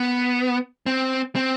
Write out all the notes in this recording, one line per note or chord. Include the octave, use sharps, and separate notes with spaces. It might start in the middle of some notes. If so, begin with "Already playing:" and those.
Already playing: B3
C4
C4